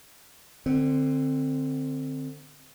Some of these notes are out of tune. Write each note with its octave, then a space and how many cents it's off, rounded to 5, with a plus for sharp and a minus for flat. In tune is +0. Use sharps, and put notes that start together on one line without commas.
D3 +25 C4 +0